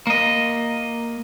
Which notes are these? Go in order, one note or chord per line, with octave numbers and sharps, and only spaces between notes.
A#3 D#5